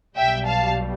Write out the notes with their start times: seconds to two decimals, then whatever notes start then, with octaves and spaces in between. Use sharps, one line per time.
0.16 B1 B2 G3 E5 G5
0.47 F5 A5